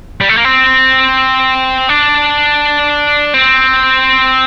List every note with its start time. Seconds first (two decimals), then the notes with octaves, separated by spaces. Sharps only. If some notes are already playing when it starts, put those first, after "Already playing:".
0.21 G3
0.29 A3
0.37 A#3
0.45 C4
1.89 D4
3.34 C4